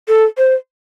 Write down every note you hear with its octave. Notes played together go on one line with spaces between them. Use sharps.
A4
C5